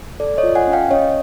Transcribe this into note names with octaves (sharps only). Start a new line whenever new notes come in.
A4 D5
C#5 D#5
F4
F#5 G#5
C#4
F5 G5
C#4 C#5 D#5